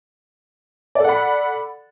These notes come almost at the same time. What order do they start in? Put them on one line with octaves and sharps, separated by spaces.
D5 A4 F#5 B5